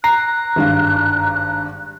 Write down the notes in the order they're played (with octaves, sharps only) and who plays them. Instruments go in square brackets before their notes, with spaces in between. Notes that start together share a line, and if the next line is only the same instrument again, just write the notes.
[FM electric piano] A#5 [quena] F#6 [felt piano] C7
[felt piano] G#1 G2 F5